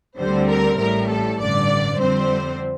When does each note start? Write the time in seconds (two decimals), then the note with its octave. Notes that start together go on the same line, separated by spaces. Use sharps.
0.19 D2 D3 G3 C4 C5
0.49 A#4
0.79 A1 A2 G3 A#4
1.09 A4
1.38 A1 G2 D3 D5
1.99 F2 D3 G3 C4 C5